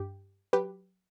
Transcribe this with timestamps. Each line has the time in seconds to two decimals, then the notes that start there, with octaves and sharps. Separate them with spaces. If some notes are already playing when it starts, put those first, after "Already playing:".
Already playing: G2 G4
0.53 F#3 G4 B4